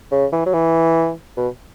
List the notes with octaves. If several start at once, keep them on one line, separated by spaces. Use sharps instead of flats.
C#3
E3
F#3
E3
B2